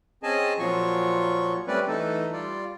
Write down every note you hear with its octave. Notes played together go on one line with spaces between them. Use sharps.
C4 C#4 G#4 D#5 G#5 A5
A#2 F3 F#3 F4 C#6
G3 A3 C4 C#4 B4 D5
E3 A3 D#4 A4
G3 F4 D5